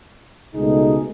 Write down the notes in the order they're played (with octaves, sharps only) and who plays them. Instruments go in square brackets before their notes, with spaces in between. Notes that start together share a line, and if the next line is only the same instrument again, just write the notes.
[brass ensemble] C#2 B2 A3 D#4 G#4